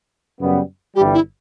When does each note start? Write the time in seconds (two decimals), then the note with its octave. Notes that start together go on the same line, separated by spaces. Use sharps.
0.40 F#2 C#3 G3 B3
0.95 G1 G2 E3 G3 G4
1.14 E4